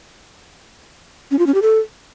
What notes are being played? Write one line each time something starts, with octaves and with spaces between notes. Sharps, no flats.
C#4
F4
C#4
G4
A4